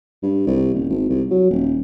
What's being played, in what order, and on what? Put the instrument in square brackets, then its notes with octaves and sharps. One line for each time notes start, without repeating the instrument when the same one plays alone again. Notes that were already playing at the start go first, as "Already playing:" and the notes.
[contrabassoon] G2
C2
D#1
G#1
C2
F#3
D#1